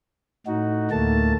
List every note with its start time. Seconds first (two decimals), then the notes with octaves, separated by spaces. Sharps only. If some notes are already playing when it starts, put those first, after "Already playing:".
0.47 A2 D#4 F#4
0.91 D2 A2 A3 A#3 A5